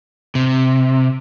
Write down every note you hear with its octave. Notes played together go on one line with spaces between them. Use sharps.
C3